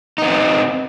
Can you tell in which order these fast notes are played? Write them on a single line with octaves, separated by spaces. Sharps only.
D#4 B3 C4